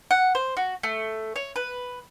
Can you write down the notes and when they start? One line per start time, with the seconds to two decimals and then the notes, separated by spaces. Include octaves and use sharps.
0.11 F#5
0.35 C5
0.57 F#4
0.83 A3
1.36 C#5
1.56 B4